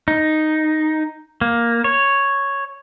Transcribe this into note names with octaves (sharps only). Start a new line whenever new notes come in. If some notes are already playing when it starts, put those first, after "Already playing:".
D#4
A#3
C#5